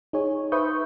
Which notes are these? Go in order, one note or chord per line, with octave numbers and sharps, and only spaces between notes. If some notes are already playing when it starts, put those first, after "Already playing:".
D#4 G#4 C#5
B4 C5 E5 C#6 D#6 G6